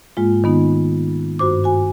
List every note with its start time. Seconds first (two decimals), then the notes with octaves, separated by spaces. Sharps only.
0.17 G#2 G#3 A#3 F4
0.44 D#3 B3 D#4
1.39 G2 F#4 C5 D6
1.64 F#4 G#5